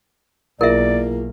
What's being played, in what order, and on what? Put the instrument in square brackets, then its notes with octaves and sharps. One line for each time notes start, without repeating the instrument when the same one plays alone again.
[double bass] B1 A#3 [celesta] E4 F4 G#4 [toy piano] A#4 E5 [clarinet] D5